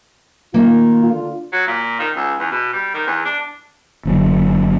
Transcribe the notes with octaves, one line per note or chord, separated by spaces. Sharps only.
D#3 A#3 F4
D3 D4 F4
F#3
A#2
D#3
C#2
E2
B2
G3
D#3
E2
D4
F#1 D3 F#3